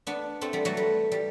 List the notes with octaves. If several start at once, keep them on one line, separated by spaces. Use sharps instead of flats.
B3 D4
A3 C4
G3 B3
F#3 A3
G3
G3